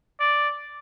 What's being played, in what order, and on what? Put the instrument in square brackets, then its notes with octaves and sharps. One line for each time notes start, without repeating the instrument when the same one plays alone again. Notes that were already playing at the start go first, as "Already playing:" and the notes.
[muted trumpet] D5